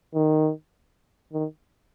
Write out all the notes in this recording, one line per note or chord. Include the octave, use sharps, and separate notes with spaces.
D#3
D#3